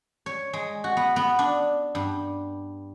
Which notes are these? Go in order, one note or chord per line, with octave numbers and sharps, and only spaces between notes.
C#5
G#3
F#4
B3
B3
D4
G2